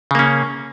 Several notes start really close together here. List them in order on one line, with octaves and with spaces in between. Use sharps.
C#3 A#3 C#4